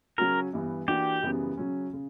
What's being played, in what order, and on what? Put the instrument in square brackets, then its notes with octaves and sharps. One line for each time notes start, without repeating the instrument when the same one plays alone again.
[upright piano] C#3 F#3 C#4 F#4 [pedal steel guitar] A#4
[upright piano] G2 E3 B3
[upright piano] E3 A#3 D4 F#4 [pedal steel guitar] G4
[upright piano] F#2 C#3 E3 G3 B3
C#3 F#3 C#4
C#3